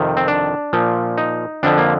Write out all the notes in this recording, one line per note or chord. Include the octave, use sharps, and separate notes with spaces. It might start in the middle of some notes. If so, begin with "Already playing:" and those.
Already playing: F2 C3 D#3
C4
D4
A#2 F3
D#4
F2 D3 F3 D4
A#3